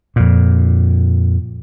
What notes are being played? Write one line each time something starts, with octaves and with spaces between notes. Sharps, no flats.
F2 A#2